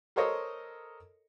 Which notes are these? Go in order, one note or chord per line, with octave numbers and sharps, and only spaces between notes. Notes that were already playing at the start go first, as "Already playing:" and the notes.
A4 A#4 C5 C#5 D#5